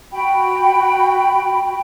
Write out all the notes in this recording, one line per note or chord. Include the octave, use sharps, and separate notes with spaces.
F#4 G5 B5